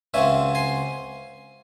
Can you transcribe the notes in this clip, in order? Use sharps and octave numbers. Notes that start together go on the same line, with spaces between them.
C#2 C#3 F#3 C4 E5 G#5
G#5 C6